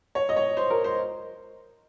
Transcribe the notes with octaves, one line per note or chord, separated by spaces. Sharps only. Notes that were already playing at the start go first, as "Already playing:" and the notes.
C#5
D#5
C#5
C5
A#4
C5